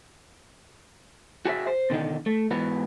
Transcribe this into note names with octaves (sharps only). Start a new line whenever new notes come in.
F#4 G#4 B4 E5
C5
B2 D3 D#3 D#4
A3
G#2 E3 B3 F#4 B4